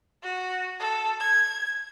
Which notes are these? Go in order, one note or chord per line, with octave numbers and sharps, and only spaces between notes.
F#4
A4
G#6